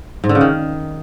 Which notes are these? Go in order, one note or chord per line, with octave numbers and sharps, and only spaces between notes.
G#2
D3
C#3
D#3